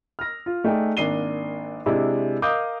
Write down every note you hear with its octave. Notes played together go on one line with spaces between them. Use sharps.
F6 A#6
F4
A3 D#4 G#4 D5 G5
G#1 A#3 D4 C7 D#7 G7
C3 G#3 D4 E4
A#4 D#5 F5 D6 D#6 G6